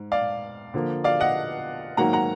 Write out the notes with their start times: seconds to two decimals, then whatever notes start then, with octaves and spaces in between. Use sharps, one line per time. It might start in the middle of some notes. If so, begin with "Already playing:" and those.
Already playing: G#2
0.12 D5 F5
0.74 D3 F3 A#3
1.04 D5 F5
1.20 D#5 F#5
1.97 G#2 D#3 F#3 A#3 F#5 A#5
2.13 F#5 A#5